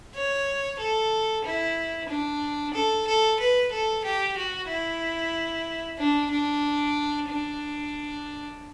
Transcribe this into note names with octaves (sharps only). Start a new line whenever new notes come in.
C#5
A4
E4
D4
A4
A4
B4
A4
G4
F#4
E4
D4
D4
D4